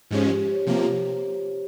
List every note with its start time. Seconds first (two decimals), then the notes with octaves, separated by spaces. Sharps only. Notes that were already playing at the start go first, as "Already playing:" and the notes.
0.11 G#2 F3 G#3 C#4 G4
0.25 G4
0.38 G4
0.53 C#5
0.67 C3 F3 A#3 C5